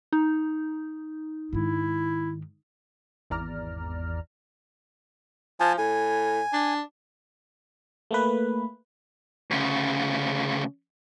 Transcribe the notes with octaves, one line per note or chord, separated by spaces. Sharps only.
D#4
G#2 D#3 E4
G#1 E2 D5 A#5 F6
F3 G#5 A5
A2 G#5
D4
A3 A#3 B4
D2 C#3